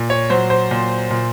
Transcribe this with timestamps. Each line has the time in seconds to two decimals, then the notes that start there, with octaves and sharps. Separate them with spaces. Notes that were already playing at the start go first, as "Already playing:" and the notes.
Already playing: A#2
0.10 C#5
0.30 F#3 C5
0.50 C5
0.71 A#2
1.11 A#2